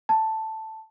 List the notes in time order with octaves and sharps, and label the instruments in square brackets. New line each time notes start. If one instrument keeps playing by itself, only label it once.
[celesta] A5